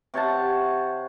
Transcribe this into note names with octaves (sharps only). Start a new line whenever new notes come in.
C3 C#5 F#5 A5